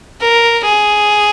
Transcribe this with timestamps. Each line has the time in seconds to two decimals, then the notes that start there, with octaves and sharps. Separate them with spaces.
0.21 A#4
0.65 G#4